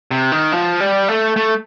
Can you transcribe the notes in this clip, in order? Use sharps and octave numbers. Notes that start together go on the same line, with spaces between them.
C3
D#3
F3
G3
A3
A3